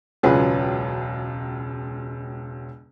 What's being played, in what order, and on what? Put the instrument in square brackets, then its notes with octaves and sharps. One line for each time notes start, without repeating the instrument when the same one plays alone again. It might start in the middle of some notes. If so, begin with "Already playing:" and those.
[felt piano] E1 C#2 F#3 F4 G#4 B4